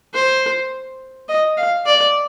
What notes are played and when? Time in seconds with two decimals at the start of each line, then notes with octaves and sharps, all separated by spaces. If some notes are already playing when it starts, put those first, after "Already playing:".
0.14 C5
1.28 D#5
1.57 F5
1.86 D5